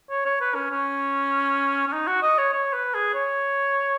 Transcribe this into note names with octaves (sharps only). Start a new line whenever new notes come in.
C#5
C#5
B4
C#4
C#4
C#4
D#4
F#4
D#5
C#5
C#5
B4
G#4
C#5